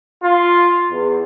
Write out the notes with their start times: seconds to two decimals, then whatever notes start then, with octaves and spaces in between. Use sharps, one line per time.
0.23 F4
0.90 E2